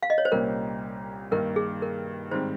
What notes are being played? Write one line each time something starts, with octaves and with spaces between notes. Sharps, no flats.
F5
D#5
C#5
C5
C2 A#2 G3 C#4 A#4
G2 D#3 A#3 D#4 A#4
G#4
A#4
G#2 D#3 G3 C4 C5